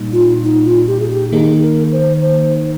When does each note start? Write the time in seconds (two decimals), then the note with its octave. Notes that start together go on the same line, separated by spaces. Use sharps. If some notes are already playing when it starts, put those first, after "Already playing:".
Already playing: A#2 G3 A#3 D#4
0.13 F4
0.43 D#4
0.65 F4
0.87 G4
1.00 G#4
1.10 G4
1.32 D#3 A#3 D#4 G#4
1.62 A#4
1.92 C5
2.22 C5